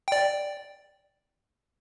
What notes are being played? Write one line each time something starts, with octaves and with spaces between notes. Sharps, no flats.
D5 G5